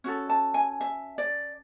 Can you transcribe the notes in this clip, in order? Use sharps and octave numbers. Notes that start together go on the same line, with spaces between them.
C#4 F#4 A4
A5
G#5
E5
D5